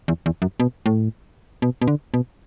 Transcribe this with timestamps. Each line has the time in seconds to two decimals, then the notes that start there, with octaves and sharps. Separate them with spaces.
0.08 E2
0.26 E2
0.42 F#2
0.60 B2
0.86 A2
1.62 B2
1.82 B2
1.88 D3
2.14 B2